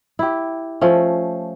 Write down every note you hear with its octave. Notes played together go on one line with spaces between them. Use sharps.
E4 G4
F3 A3 C#4